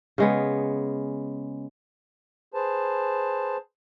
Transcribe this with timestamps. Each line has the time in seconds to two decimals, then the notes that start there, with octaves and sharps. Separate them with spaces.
0.18 C#3 G#3 B3
2.54 G#4 B4 C5 A5